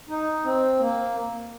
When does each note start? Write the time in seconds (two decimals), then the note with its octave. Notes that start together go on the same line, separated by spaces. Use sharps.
0.09 D#4
0.44 C4
0.79 A#3